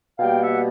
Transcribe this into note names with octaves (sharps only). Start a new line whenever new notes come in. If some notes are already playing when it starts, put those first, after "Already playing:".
B2 G3 A#3 F5 G5
E5 F#5